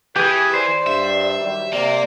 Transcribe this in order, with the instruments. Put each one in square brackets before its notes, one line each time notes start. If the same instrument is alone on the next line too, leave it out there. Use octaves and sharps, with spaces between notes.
[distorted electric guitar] E3 [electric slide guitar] G4 G#4 [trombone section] B4
[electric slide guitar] C5 [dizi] D5
[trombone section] G2 [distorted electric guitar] E5
[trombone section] D#3 F#3 G3
[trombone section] C3 [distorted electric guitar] A#3 [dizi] D5